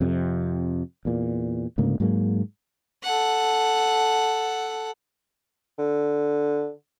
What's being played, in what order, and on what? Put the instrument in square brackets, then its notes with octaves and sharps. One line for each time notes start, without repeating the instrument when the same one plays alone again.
[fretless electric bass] F2 C3
E2 A#2
D2 G#2 C#3 A#3
G#2 F#3 G#3 A#3
[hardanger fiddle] A4 F#5
[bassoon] D3